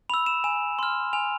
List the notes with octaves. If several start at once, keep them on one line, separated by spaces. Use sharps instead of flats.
B5 E6 F7
E7
G#5 E7
C6 F6
G#5 F7